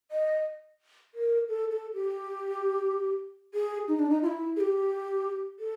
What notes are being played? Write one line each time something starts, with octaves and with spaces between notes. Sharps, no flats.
D#5
A#4
A4
A4
G4
G#4
D#4
D4
D#4
F4
E4
G#4
G4
A4